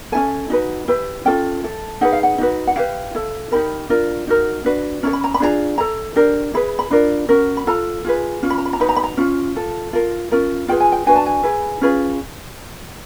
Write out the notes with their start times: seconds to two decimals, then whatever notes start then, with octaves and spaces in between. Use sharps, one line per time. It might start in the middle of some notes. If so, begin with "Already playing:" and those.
0.12 C#4 E4 A4 G#5
0.50 D#4 F#4 B4
0.88 E4 G4 B4
1.25 C#4 F4 A4 G5
1.63 E4 A4
2.01 D#4 G#4 B4 F#5
2.12 F5
2.23 F#5
2.38 D#4 F#4 B4
2.67 F#5
2.76 E4 G4 B4 F5
3.15 E4 A4
3.52 D#4 G4 A#4 B5
3.89 D4 F4 A#4
4.27 D#4 F#4 A#4
4.65 D4 F#4 B4
5.03 C#4 E4 A4 A#5
5.13 B5
5.24 A#5
5.34 B5
5.40 D4 F4 G#4 B4 A#5
5.78 E4 A4 A#5
6.16 D4 G4 A#4
6.54 E4 G#4 B4 B5
6.79 B5
6.91 D4 F4 A#4
7.29 C#4 F#4 A#4
7.57 B5
7.67 F4 A4 A#5
8.05 F4 G#4 B4
8.42 C#4 F4
8.50 B5
8.58 A#5
8.65 B5
8.73 A#5
8.80 D#4 F#4 B4 B5
8.89 A#5
8.96 B5
9.03 A#5
9.17 C#4 F4
9.55 F4 A4
9.93 F4 A#4
10.31 C#4 F4 A#4
10.68 F4 G#4 B4 G5
10.80 G#5
10.92 G5
11.06 D4 F#4 B4 G#5
11.16 A5
11.26 G#5
11.43 E4 G#4 B4
11.81 C#4 F4 G#4 B4